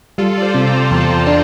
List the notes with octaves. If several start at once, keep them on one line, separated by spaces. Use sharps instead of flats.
G3 F4 A4
D5
A4 C5
C3
G5 A#5
E2 A5 C6
D4 A5 C6